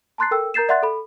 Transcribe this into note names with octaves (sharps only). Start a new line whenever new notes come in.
A5 A#5 C6 F#6 A6 C7
A4 A#4 G5 E6
A#4 A#5 G6 A6 C7 E7
D5 E5 F#5 C6 F#6 A6
A4 B5